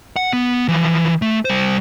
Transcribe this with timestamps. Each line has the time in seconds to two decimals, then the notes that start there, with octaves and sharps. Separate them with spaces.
0.16 F#5
0.33 B3
0.68 E3 F3
1.22 A3
1.45 G3 C5